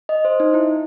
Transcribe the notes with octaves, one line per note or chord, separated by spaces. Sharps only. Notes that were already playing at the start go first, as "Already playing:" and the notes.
D#5
C5
D#4
E4